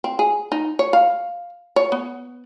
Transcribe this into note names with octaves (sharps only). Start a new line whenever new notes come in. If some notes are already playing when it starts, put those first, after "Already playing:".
C4
G#4
D#4
C#5
F5
C#5
B3